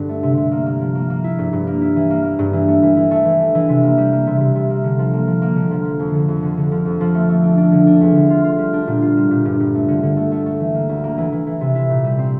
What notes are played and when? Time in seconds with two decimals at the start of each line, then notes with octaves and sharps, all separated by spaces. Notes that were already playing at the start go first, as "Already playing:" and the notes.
Already playing: G2 D3 D4
0.09 A3
0.23 C3
0.37 C3
0.52 A#3
0.66 A#3
0.81 F3
0.95 A#3
1.10 A#3
1.24 E4
1.39 G2
1.53 G2
1.67 A#3
1.81 E4
1.96 E3
2.10 A#3
2.24 A#3
2.39 G2
2.53 E3
2.68 A3
2.83 E3
2.97 E3
3.11 A3
3.25 E3
3.40 D4
3.55 E3
3.69 C3
3.83 A#3
3.98 G3
4.12 A#3
4.27 C3
4.40 C3
4.55 C3
4.70 A#3
4.84 D3
4.99 F3
5.13 A#3
5.28 F3
5.42 A#3
5.56 D3
5.71 F3
5.85 F3
5.99 F2
6.14 D3
6.28 F2
6.42 D3
6.57 D3
6.71 F3
6.85 F2
7.01 F3
7.14 A3
7.29 A3
7.43 D4
7.58 D4
7.72 D3
7.87 D4
8.01 E2
8.15 D3
8.30 F4
8.44 F4
8.58 G3
8.73 D4
8.87 A#2
9.02 F4
9.16 G3
9.31 A#2
9.45 G2
9.60 G2
9.74 A3
9.88 D3
10.03 D3
10.17 A3
10.32 A3
10.46 A3
10.60 E3
10.75 A#3
10.89 D2
11.04 A#3
11.18 E3
11.33 E3
11.47 E3
11.61 C3
11.75 E4
11.90 A#2
12.05 G3
12.19 C4